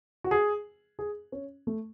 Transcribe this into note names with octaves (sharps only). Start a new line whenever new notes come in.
F#4
G#4
G#4
C#4
A3